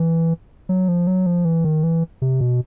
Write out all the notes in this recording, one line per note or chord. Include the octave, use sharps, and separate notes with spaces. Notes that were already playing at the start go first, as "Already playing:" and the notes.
Already playing: E3
F#3
F3
F#3
F3
E3
D#3
E3
C3
B2